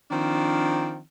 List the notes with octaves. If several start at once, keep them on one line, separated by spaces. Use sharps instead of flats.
D#3 F3 C4 D4